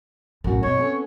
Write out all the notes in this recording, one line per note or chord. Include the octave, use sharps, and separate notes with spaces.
A1 F#2 E4 F#4
B2 C4 E4 C#5
B3 C#4 A4